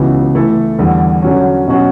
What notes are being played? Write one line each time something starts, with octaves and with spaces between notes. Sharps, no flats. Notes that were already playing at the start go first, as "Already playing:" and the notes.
Already playing: C#2 C#3 E3 B3 F#4
E3 A3 E4 A4
E2 D3 G3
D3 F#3 C#4
B2 F#3 C#4 F#4